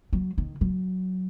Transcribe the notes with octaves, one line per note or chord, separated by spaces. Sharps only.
F#3
D#3
F#3